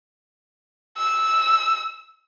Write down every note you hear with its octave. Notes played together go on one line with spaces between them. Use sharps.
E6